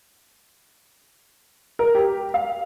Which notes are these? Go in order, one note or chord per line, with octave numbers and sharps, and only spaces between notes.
A#4
G4
F5